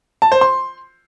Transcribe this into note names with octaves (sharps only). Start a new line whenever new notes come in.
A5
C5
C6